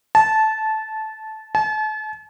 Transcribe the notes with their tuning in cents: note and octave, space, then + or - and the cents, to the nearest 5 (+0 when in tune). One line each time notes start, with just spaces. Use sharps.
A5 -15
A5 -40